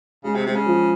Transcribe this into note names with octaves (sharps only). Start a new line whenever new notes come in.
C#3 G#3
C3
C3 G#3
C#3
F3